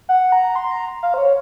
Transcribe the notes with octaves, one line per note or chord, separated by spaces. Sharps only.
F#5
A#5
C6
A#5
F5
C5
C#5